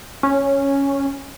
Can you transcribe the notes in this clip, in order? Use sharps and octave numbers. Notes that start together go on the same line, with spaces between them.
C#4